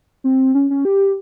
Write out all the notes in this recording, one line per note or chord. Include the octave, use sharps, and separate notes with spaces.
C4
C#4
C#4
G4